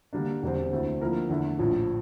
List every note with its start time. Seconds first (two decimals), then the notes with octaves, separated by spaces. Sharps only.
0.13 D3 G3 A#3 D4
0.42 E1 E2 D3 G3 C4
0.72 D2 D3 A3 C4 E4
1.01 D3 F3 A#3 E4 A#4
1.29 E2 D3 A3 E4
1.59 A#1 A2 F3